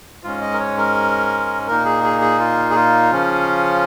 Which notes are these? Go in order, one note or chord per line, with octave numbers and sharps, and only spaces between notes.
G#2 G#3 C#4 F4
D#5
A#4
C#5
A#4
A#2 A#3 D#4 A#4
G#4
G#4
G#4
F4
G#4
F4
C#3 F3 C#4